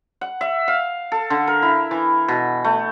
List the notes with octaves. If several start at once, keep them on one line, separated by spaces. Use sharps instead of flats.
F#5
E5
F5
A4
D3
A#4
E4
E3
B2
A3